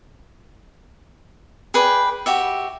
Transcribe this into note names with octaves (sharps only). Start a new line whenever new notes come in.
G#4 B4 D5 G5
F#4 G4 E5